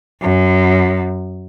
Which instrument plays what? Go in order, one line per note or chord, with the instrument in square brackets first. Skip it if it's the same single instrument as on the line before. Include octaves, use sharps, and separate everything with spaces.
[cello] F#2